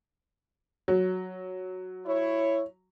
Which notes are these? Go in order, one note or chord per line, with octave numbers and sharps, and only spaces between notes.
F#3
E4 C#5